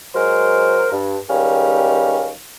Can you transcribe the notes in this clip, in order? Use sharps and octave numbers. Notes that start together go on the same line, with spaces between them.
F#3 G#3 A#4 C5
G2
C#2 D#3 G3 C#4 F5